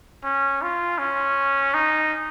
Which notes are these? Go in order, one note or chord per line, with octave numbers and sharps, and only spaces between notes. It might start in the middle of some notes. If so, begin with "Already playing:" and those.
C#4
F4
C#4
D#4